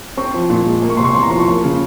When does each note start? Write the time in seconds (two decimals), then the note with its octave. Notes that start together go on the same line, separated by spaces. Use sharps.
0.17 C4 C#6
0.34 F3
0.50 A#2
0.66 G#3
0.82 A#3
0.90 C#6
0.97 C3 C6
1.04 C#6
1.15 E2 C6
1.23 A#5
1.31 F3 C6
1.40 C#6
1.48 A#3
1.64 C#3